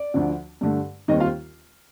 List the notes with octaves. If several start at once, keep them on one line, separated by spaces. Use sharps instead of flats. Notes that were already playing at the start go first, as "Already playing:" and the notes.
Already playing: D5
D2 D3 F3
G2 D3 A3
D#2 D#3 G3 C4 D#4 D#5
F4 F5